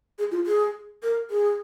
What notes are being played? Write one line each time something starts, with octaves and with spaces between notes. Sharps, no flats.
G#4
F4
G#4
A#4
G#4